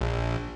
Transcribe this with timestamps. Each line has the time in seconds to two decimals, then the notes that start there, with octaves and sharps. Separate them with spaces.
0.01 A#1